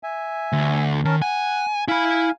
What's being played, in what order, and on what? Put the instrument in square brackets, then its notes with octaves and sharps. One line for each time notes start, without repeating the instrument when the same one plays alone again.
[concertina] E5 G#5
[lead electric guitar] D2
[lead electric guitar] D#3 [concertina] C#4 A#4 A5
[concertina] F#5 F#6 [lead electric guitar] G#5
[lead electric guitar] E4 B5 [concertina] F5 G#5